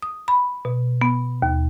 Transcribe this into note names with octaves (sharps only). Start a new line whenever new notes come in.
D#6
B5
B2
B3
D#2